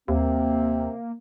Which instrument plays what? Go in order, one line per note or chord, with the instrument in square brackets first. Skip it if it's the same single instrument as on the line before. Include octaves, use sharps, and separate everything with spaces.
[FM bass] D#2 [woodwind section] C3 C4 [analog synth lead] A#3